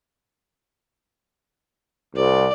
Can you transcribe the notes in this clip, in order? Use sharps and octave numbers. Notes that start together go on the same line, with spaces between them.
C2 D5